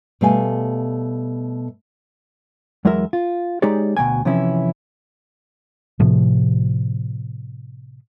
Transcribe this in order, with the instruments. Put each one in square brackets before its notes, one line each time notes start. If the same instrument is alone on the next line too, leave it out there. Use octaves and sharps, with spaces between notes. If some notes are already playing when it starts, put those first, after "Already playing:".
[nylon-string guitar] B2 G3 A3 G4 F5 G#5
[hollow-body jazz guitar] E2 F#3 G#3 E4 A#4 E5
F4
G#3 D#4 G4 G#4 C#5 D5
D2 B2 F#3 G5 G#5
C3 E3 F3 C#4 E4
[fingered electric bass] A2 C3 F3